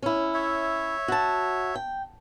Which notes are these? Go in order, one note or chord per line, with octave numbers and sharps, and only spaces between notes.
C#4 E4
C#5 E5
F#4 A5
G5